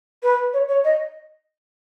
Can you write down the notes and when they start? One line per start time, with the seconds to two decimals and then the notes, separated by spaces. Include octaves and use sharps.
0.23 B4
0.53 C#5
0.68 C#5
0.84 D#5